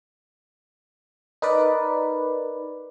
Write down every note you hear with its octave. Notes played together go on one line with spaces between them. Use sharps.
D#4 A#4 B4 D5